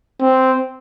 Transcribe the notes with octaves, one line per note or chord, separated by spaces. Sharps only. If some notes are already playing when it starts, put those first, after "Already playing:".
C4